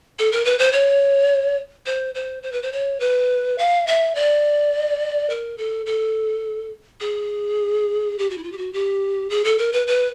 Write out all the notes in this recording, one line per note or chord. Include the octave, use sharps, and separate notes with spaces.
A4
A#4
B4
C5
C#5
C5
C5
C5
B4
C5
C#5
B4
F5
E5
D5
A#4
A4
A4
G#4
G4
F#4
E4
F4
G4
F#4
G4
G#4
A4
A#4
B4
B4